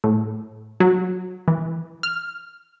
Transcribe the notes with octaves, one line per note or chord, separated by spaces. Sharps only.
A2
F#3
E3
F6